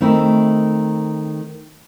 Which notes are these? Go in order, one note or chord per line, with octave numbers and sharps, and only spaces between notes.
D#3 A3 C4 E4